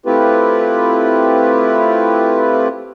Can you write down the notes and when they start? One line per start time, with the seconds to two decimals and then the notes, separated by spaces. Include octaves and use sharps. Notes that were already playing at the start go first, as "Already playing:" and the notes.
0.06 A3 C4 E4 F4 G4 B4